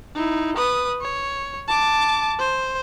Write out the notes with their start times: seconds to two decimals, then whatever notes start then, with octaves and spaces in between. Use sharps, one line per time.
0.15 D#4 E4
0.56 B4 D#6
1.01 C#5
1.68 A5 D6
2.39 C5